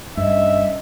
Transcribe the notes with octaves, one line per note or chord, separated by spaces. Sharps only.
G2 C#4 D4 D#5 E5